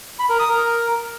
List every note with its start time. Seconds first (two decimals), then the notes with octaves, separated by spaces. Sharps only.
0.19 B5
0.29 A#4
0.39 D#6
0.49 A#4